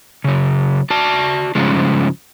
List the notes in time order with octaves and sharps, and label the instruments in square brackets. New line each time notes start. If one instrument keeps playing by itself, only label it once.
[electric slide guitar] C#3 F#3
F#4 D5 A5
G2 C#3 F3 G#3